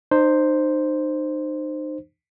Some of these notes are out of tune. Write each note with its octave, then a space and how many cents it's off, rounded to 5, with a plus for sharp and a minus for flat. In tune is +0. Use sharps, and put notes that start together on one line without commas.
D#4 -35 C5 +0